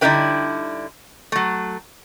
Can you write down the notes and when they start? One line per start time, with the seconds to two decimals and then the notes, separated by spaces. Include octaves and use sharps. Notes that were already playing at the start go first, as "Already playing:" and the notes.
0.01 D3 G3 D#4 E4 B4 G5
1.32 F#3 A3